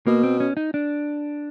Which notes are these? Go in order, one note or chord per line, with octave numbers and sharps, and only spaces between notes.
B2 A#3
C4
C#4
D#4
D4